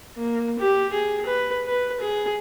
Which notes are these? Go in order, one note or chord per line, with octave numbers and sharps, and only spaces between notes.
A#3
G4
G#4
B4
B4
G#4